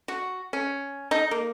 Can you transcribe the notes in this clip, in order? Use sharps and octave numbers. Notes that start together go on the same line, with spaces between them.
F#4
C#4
D#4
A#3